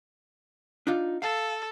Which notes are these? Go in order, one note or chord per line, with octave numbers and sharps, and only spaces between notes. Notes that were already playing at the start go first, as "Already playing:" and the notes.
D4 D#4 F4
A4 F5